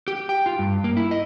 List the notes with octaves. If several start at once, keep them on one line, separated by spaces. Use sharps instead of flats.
G4
G5
F4
G2
A#3
E4
D#5